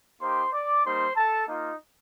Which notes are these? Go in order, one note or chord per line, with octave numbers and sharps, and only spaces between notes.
A#3 D#4 G4 C5 C6
D5 D6
G3 A#3 D#4 G4 C5 C6
A4 A5
A#3 D#4 F4 D#5